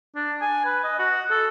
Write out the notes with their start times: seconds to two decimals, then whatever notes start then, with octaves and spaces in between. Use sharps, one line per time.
0.16 D4
0.41 G#5
0.65 B4
0.84 D#5
0.99 F#4
1.31 A4